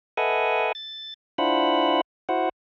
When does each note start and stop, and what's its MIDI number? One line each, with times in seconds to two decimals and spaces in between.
0.17 0.72 69
0.17 0.72 71
0.17 0.72 75
0.17 0.72 76
0.17 0.72 78
0.17 0.72 80
0.75 1.14 93
1.38 2.01 62
1.38 2.01 64
1.38 2.01 65
1.38 2.01 72
1.38 2.01 78
1.38 2.01 83
2.29 2.49 64
2.29 2.49 66
2.29 2.49 72
2.29 2.49 78